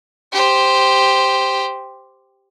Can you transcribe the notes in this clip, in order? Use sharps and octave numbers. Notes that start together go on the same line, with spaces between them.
G4 C5